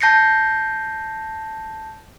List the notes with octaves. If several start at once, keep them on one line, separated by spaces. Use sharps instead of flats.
A5 G6 A#6 C7 C#7